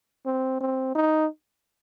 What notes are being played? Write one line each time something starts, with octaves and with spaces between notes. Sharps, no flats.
C4
C4
D#4